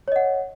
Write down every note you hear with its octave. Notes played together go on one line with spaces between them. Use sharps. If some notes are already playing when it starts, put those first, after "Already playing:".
C#5 D#5 F#5